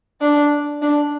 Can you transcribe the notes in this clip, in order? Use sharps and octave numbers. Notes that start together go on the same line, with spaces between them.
D4
D4